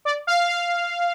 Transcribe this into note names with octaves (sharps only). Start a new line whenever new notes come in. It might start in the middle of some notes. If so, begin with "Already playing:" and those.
D5
F5
F5